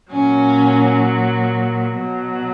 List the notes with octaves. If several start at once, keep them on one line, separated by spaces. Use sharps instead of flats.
A#2 F#3 C#4
B2 F#3